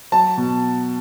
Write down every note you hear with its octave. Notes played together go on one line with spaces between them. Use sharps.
F#3 A5
B2